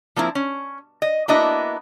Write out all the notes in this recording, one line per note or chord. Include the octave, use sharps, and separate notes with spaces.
F3 A#3 C4 E4
C#4
D#5
A#3 B3 D4 E4 F#4 D#5